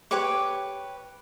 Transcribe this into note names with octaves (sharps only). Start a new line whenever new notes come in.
G4 B4 C#5 D6